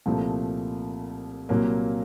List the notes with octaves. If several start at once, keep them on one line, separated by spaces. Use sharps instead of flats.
C2 A#2 F3 A3
C2 A#2 F#3 A#3